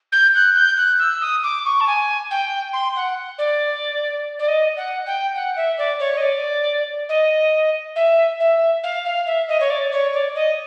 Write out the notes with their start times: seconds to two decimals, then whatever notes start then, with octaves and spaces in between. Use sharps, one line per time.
0.12 G6
0.34 F#6
0.55 G6
0.77 F#6
0.99 E6
1.21 D#6
1.43 D6
1.65 C#6
1.80 A5
1.86 G#5
2.30 G5
2.73 C6
2.95 F#5
3.38 D5
4.39 D5
4.48 D#5
4.76 F#5
5.06 G5
5.35 F#5
5.56 E5
5.77 D5
5.99 C#5
6.16 D#5
6.21 D5
7.08 D#5
7.95 E5
8.39 E5
8.83 F5
9.04 F5
9.26 E5
9.48 D#5
9.60 C#5
9.69 D5
9.91 C#5
10.13 D5
10.35 D#5